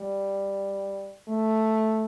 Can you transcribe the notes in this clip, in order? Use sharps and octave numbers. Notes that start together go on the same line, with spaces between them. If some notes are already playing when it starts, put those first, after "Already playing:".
Already playing: G3
A3